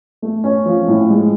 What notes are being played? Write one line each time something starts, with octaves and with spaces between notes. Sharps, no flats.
A3
C#4
F3
A2
G#3